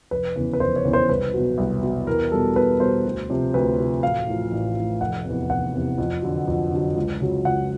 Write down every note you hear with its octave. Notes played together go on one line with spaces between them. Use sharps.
F1 B4
E2 C#3
B4
F1 C5
C#5
E2 C#3
C5
C2 B4
B2 F#3
C2
B2 F#3
E2 A#4
B2 G3 A4
E2 B4
B2 G3 C5
D2
C3 F3
D2 B4
C3 F3
A1 F5
A2 F3
A1
A2 F3
F1 F#5
E2 C3
F1 F#5
E2 C3
F2
D3 F#3
F2
D3 F#3
C#2
C#3 F#3
C#2 F#5